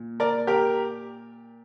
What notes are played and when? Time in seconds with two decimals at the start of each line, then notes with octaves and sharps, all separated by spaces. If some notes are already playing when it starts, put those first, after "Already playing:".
Already playing: A#2
0.20 A#4 D5
0.47 G4 A#4